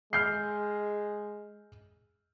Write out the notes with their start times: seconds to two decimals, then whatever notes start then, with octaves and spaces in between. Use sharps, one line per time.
0.13 G#3 F6 G6 C7